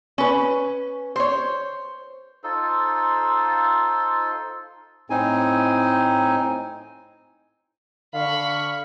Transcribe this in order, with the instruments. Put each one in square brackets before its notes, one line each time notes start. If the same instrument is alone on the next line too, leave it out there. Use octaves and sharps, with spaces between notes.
[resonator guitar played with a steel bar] C#4 B4
C5 C#5
[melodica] D#4 F4 A4 C5
[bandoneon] A2 C4 D#4 G#5
[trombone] D3 [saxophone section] F5 [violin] B5 C#6